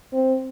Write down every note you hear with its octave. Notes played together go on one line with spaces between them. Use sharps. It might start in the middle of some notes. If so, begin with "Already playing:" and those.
C4